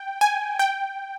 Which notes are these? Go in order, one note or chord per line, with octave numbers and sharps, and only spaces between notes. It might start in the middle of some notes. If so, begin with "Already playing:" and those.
Already playing: G5
G#5
G5